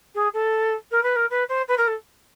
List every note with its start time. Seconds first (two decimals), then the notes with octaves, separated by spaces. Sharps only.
0.15 G#4
0.33 A4
0.91 A#4
1.02 B4
1.15 A#4
1.30 B4
1.48 C5
1.68 B4
1.77 A#4
1.87 A4